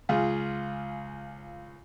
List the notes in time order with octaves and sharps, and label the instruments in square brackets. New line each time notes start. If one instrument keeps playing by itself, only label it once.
[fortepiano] C#2 F4 G#4